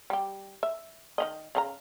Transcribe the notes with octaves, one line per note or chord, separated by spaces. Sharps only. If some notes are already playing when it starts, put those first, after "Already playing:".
G3 G4
E5
D#3 C#4 D#5
C#3 D#4 A#5